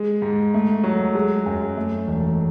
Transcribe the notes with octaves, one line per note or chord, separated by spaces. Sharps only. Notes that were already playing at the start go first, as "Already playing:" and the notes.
Already playing: G#3
G#2
A3
F#3
G#3
F#2
A3
E1